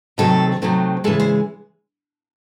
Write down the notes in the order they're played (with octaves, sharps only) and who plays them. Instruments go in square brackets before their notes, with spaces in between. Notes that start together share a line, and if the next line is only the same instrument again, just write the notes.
[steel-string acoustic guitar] C3 D#3 F#3 A3 C4 A4
C3 D#3 F#3 A3 C4
C#3 E3 G#3 A4
C5